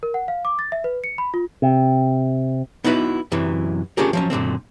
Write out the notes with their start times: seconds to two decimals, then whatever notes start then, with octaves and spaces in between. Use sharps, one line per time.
0.03 A#4
0.14 F#5
0.28 F5
0.45 D6
0.59 A6
0.72 E5
0.84 B4
1.04 C#7
1.18 B5
1.34 F4
1.62 C3
2.84 B3 D#4 E4 F#4 B4
3.32 F#2 C3 E3 F#3
3.97 C#4 D4 F4 G4 G#4 A#4
4.13 F3 F#3 C#4
4.30 F#2 A#2 D3 C4